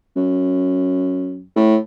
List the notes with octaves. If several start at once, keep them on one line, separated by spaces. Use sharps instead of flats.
F#2
A2